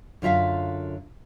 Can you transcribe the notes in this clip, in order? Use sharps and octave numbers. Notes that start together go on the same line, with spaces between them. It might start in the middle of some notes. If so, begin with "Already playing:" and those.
F#2 D3 F4 E5 F5